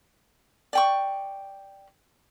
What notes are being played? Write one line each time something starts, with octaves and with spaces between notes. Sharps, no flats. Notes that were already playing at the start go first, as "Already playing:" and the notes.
D5 G5 C#6